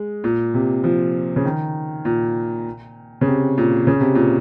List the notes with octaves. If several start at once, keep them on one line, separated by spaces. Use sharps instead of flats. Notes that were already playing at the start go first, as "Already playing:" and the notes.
Already playing: G#3
A#2
C3
F3
C#3
D#3
A#2
C#3
C3
A#2
C#3
C3
A#2